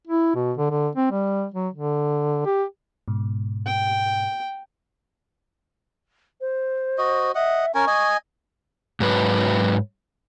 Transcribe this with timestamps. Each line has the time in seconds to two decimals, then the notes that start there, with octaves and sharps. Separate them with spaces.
0.07 E4
0.35 B2
0.57 D3
0.71 D3
0.95 C4
1.12 G3
1.54 F#3
1.74 D3
2.46 G4
3.08 G#2 B2
3.66 G5
6.41 C5
6.98 F#4 D#5
7.35 D#5 E5 F#5
7.75 C#4 A#4 G#5 C#6
7.87 D#5 G#5
9.00 G#2 F#3 B4